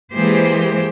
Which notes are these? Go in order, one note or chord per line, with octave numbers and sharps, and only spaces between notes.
E3 G#3 A#3 G4 G#4 C5